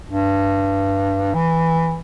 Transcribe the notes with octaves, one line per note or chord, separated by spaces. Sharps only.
G2
E3